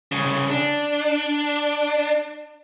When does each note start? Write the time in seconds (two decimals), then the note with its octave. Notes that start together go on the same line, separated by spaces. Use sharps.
0.12 C2 C#3
0.50 D4